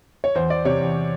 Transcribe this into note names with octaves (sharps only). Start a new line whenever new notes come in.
C#5
E2 C5
E2 D5
C3 C#5
E2